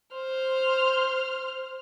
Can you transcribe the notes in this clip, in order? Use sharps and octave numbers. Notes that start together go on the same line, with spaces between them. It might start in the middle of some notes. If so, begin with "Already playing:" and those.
C5 F6